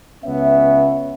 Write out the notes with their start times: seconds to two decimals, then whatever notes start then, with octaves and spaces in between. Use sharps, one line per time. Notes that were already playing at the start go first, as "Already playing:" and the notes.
0.25 C#2 B3 C#4 E5